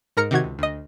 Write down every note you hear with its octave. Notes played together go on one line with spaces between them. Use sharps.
G#2 A#4 A#5 F6 C#7
C3 D#3 F#4 G#6
C#2
D2 D#5